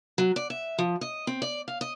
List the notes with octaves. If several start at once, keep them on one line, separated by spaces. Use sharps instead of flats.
F#3
D5
E5
F3
D#5
C4
D5
F5
D#5